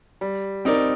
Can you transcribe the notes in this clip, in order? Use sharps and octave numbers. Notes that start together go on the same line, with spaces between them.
G3
C4 D#4 A#4 D5